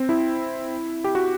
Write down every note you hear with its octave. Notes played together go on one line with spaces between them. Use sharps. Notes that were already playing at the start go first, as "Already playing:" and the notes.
Already playing: C4
E4
G4
F#4